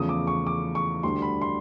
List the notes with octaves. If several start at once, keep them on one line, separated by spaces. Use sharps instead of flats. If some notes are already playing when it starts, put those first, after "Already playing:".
Already playing: E2 C#3 F3 A3 D#6
D6
C#6
D6
C#6
D2 D3 G3 C6
B5
C6